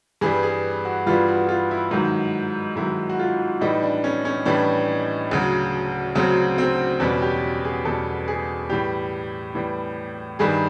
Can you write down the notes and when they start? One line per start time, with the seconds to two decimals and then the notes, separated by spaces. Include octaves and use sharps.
0.21 G2 E3 G3 G#4
0.43 G#4
0.85 F#4
1.06 G2 E3 G3 F4
1.28 F#4
1.49 F4
1.71 E4
1.91 G#2 D#3 F#3
2.76 G#2 D#3 F#3 E4
3.09 F#4
3.19 F4
3.61 A2 E3 G3 D#4
3.82 D4
4.04 C#4
4.25 C#4
4.45 A2 E3 G3 D4
5.31 D2 C#3 F#3
6.15 D2 C#3 F#3 C4
6.58 C4
7.00 E2 B2 G3 C#4
7.22 G4
7.65 G#4
7.85 E2 B2 G3 A4
8.28 G#4
8.70 A2 E3 G3 G4
9.55 A2 E3 G3
10.39 G2 D#3 G3 G#4